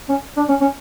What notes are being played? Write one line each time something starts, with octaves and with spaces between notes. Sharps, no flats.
C#4
D4
C#4
C#4